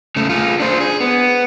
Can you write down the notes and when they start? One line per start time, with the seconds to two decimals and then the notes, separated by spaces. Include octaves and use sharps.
0.16 C#3 A3
0.30 F4 G#4
0.59 D4 C5
0.81 G#4
1.00 B3